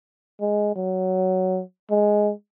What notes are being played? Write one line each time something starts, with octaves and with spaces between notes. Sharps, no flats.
G#3
F#3
G#3